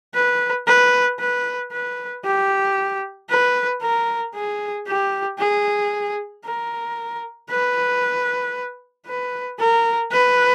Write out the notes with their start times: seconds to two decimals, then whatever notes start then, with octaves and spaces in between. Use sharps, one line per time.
0.14 B4
0.67 B4
1.20 B4
1.72 B4
2.25 G4
3.29 B4
3.82 A#4
4.35 G#4
4.87 G4
5.39 G#4
6.45 A#4
7.50 B4
9.07 B4
9.59 A#4
10.12 B4